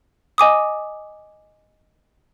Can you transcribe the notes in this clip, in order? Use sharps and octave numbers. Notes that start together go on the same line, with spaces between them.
D#5 G#5 D6 D#6